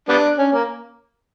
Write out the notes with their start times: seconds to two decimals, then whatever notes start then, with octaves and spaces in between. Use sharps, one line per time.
0.09 G3 B3 D4
0.38 C#4
0.53 A#3